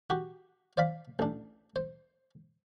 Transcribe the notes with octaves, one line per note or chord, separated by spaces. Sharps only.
F#4 G4
C5 D5 F5 B5
A1 D4
C5